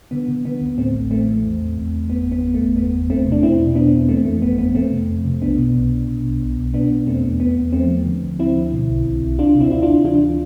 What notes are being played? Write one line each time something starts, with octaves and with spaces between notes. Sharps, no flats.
D3 B3
D3
D3 B3
D2
A2 A3 C4
A1
A2 A3 C4
E3
E2
E2
E2
E2
G1 B3
G1 B3
G1
A3
G1
E2 B3
E2
E2 A3 C4
C3
D4
E2 C4 E4
B2
B2 B3 D4
E2
E3 A3 C4
F2 A3
G1 B3
F2 B3
F2 A3 C4
C3
F2
C3
B1 B3 D4
B2
B1
B1
B2
B1
B1
B1
B2 B3 D4
B2
E2 A3 C4
E2
E2 B3
E2
F3 A3 C4
F3
D3
D2
F3 C4 E4
D3
B2
B1
B1
B1
D2 D4 F4
C3
C4 E4
C3 E4
D4 F4
D2
E3 D4 F4